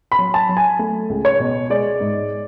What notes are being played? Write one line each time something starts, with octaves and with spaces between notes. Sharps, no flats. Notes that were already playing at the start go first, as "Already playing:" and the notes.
B5
F#3
A5
F#3
G#5
A3
C#2
C#5
B2
G#3 D5
G#2